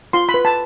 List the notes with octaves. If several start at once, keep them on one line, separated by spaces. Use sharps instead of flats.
F4 C6
B5
B4
A5